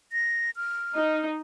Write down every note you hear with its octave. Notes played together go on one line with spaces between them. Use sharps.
A#6
F6
D#4